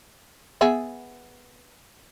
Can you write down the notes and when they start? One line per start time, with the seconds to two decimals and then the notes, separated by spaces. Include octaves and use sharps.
0.61 B3 G#4 E5